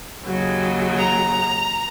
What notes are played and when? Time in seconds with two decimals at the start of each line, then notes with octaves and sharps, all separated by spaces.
0.25 D#2 C#3 F#3
0.98 A#5